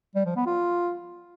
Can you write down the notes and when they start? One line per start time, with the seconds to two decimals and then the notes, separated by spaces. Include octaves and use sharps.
0.15 G3
0.26 F3
0.36 B3
0.46 F4